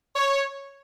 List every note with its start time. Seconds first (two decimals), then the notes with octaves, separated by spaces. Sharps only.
0.16 C#5